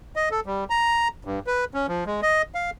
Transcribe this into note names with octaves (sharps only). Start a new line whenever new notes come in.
D#5
A4
G3
A#5
G2
B4
C#4
F3
G#3
D#5
F5